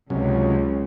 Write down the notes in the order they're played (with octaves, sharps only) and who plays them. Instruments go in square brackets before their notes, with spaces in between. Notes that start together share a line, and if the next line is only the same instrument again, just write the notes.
[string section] C#2 [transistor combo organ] C3 F#3 C#4